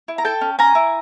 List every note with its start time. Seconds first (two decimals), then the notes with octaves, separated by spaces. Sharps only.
0.08 E4
0.18 A#5
0.24 A4 G5 A5
0.41 C#4
0.59 C#4 G#5 A#5
0.75 E4